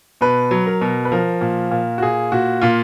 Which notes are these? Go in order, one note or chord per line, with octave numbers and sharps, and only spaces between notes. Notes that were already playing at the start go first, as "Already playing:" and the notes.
B2 B4
F#3
A#4
B2
B4
F3 A#4
A#2
A#2
F#4
A#2 G#4
A#2 F#4
A#2 F4